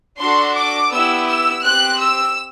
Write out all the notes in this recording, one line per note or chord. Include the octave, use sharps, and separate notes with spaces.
D4 F#4 A4 C6
D6
B3 E4 G4 E6
E6
C4 G4 F#6
E6